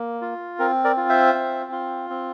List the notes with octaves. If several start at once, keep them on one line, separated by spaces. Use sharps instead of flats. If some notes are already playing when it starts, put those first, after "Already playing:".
Already playing: A#3
F4
C4 A#4
A#4 D5
F4
C5 E5
C4
F4
C4